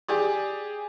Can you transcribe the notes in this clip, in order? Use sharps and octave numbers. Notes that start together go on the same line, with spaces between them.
G4 G#4 D5